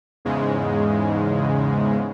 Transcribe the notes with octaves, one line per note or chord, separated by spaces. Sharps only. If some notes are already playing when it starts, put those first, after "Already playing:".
E2 G#2 C#3 G#3